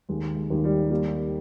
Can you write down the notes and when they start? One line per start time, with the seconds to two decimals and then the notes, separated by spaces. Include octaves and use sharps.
0.09 D#2 G#3
0.36 G#3
0.50 D#2
0.64 G3
0.90 G3 A#3